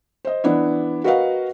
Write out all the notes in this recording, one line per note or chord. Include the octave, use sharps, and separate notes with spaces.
C5 D#5
E3 B3 D4 E4
F#4 A#4 B4 D#5 F5 F#5